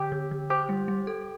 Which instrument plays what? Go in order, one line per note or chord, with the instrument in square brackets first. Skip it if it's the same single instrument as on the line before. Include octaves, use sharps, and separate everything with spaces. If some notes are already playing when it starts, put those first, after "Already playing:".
Already playing: [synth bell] D3 [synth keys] G4
[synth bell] D3
D3
[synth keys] G4 [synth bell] C5
[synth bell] G3
G3
A4